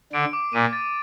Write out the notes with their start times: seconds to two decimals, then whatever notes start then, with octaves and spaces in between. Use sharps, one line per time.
0.13 D3 D7
0.33 D6
0.53 A#2 D#7
0.73 A6